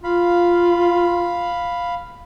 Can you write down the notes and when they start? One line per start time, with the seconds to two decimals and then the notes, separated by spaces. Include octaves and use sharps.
0.04 F4 F5 B5